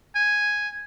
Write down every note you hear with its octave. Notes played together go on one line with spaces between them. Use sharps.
G#5